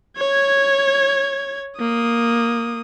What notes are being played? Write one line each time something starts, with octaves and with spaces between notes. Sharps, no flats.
C#5 G#6
A#3 D#6